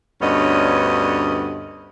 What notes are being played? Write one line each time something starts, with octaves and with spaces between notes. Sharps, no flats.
D2 G2 B3 C#4 C#5 D#5